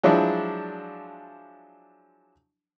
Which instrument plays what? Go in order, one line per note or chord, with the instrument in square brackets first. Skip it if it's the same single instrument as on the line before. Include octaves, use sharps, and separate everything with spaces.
[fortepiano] F3 F#3 G#3 D4 E4